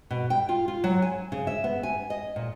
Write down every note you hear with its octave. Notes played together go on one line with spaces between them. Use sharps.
B2
G5
F4
F4
F#3
G#5
C#3
E5
B3
G#5
D#5
A#2